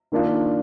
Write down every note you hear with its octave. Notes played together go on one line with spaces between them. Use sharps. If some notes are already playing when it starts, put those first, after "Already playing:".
D#3 A#3 D4 F4